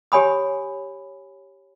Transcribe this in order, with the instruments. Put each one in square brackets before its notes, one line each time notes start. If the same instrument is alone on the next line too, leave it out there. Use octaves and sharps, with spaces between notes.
[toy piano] G4 C#5 G#5 B5 D#6